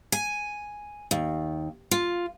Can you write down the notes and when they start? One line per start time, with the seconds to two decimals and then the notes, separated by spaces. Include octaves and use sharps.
0.12 G#5
1.11 D#2
1.91 F4